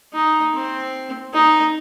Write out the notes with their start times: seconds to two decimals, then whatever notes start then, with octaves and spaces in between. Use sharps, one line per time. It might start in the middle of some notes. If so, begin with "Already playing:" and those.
0.13 D#4
0.54 C4
1.33 D#4